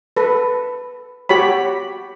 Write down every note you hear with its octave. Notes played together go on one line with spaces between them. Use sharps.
A4 B4
F#4 G4 C#5 B5